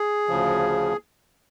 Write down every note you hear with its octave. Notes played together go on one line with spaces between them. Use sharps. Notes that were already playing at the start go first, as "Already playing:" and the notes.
Already playing: G#4
D2 C#3 F3